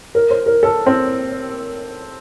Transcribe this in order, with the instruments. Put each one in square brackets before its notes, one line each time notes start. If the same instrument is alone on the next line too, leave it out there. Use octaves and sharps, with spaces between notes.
[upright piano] A#4
C5
A#4
A4
C4